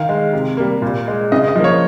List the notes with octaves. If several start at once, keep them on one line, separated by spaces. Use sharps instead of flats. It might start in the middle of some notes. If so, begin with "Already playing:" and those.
Already playing: D#3 F5
G#3
C3
G3 A#3
A#2
G#3
C#3 D#5
D#5
F3 A#3
C#5